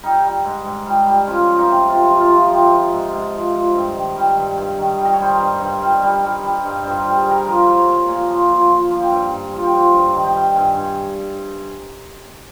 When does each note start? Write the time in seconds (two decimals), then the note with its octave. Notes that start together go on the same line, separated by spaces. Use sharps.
0.03 G3 D#4
0.25 G3
0.45 G#2
0.65 G#2
0.86 G3
1.06 G3
1.27 F3 C#4
1.48 F3
1.59 D#4
1.68 C3
1.89 C3 F4
2.10 F3
2.21 F4
2.31 F3
2.51 F3 G4
2.72 F3
2.93 G#2
3.12 G#2
3.34 F3
3.54 F3
3.75 G2
3.96 D#3
4.16 G3
4.37 G2
4.57 G2
4.78 D#3
4.99 G3
5.05 D#5
5.13 C#5
5.20 G3 C5
5.30 A#4
5.40 G2
5.60 G2
5.81 G3
6.02 G3
6.23 G3
6.43 G3
6.64 G2
6.84 G2 C5
6.99 A#4
7.05 G3
7.15 G#4
7.26 G3
7.31 A#4
7.46 F3 A#4
7.67 F3
7.77 C#5
7.88 A#2
8.08 A#2 F5
8.29 F3
8.49 F3
8.69 F3 F5
8.91 F3
9.00 G5
9.11 G2
9.32 G2
9.53 F3
9.63 G5
9.73 F3
9.93 G2
10.14 D#3
10.24 G5
10.35 G3
10.56 G2 G#5
10.76 G2